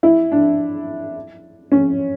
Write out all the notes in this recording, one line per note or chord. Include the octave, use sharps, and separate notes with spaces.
E4
D4
C#4